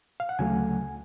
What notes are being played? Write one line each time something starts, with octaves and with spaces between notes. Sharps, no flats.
F5
F#5
D2 C#3 F#3 A3 G#5